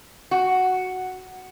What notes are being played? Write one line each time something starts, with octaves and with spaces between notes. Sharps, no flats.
F#4